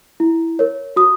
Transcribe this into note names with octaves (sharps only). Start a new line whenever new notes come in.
E4
A#4 C#5
F#4 D#6